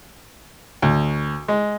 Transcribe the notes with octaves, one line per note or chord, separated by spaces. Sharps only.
D2
G#3